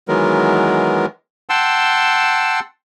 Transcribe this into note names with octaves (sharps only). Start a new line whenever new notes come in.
D#3 E3 F#3 G#3 B3 A#4
F#5 G5 A5 C6 E6